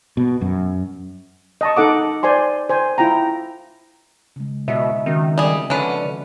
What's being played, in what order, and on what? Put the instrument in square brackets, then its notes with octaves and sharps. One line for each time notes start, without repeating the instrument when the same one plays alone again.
[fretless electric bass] B2
F#2
[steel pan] D#5 A5 C#6
D#4 A4 F#5 D6
C5 D5 G#5 C6
C5 G#5
E4 F4 G5 A#5
[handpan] C#3 G#3
[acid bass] B2 [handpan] D#5 E5
[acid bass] D#3 [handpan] C4 C#4 F#4
[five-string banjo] G3 G#4
[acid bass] D3 [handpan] F3 [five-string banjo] C#4 B4